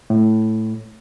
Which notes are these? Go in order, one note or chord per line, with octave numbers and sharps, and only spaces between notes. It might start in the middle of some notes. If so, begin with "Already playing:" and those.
A2